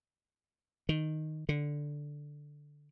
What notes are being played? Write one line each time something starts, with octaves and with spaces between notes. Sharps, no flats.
D#3
D3